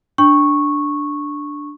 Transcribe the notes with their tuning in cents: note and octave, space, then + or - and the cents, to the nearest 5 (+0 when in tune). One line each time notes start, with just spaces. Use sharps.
D4 +0 C#6 -10